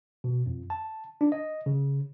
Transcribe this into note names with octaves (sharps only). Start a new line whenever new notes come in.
B2
F2
A5
D4
D#5
C#3